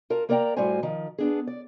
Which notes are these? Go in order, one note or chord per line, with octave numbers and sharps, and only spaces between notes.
F4 A#4 A5
A#3 A#4 D5 F#5 G5 A#5
A2 G3 F4 F#4 C5 G#5
D#3 F3
B3 D4 G#4
D5